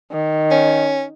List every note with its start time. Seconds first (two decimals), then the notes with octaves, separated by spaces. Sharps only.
0.12 D#3
0.51 C#4